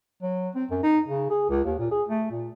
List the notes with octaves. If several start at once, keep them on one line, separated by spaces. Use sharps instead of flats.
F#3
C4
F#2
D#4
C#3
G#4
C#2
D#2
A#2
G#4
A3
A#2